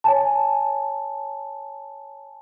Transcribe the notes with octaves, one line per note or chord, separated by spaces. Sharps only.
C#5 G#5 A5